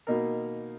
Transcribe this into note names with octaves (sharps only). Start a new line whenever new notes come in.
B2 A#3 D#4 A#4